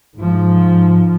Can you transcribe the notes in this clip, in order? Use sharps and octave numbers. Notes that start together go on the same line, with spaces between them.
G#2 F3